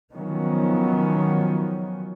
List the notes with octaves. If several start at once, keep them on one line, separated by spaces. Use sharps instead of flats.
D#3 F3 F#3 B3 C#4